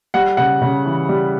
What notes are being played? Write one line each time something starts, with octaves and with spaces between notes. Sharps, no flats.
G3 F#5
C#3 F#5
C#3
E3
G3